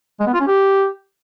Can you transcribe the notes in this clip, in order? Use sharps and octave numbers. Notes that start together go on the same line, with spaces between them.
G#3
B3
F4
C#4
G4